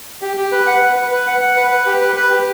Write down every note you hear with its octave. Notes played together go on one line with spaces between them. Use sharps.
G4
G4
B4
F#5
B4
B4
B4
F#5
F#5
B4
B4
G4
B4
B4
G4